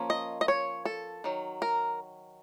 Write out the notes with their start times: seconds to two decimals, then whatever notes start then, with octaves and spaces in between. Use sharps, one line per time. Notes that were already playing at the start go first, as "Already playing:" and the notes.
Already playing: F3 A#3 C#4
0.10 D#5
0.41 D#5
0.48 C#5
0.85 A4
1.24 D#3 F#3
1.62 A#4